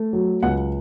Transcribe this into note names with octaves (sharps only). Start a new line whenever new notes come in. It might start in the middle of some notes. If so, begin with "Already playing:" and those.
Already playing: A3
F#3
C#2 F#5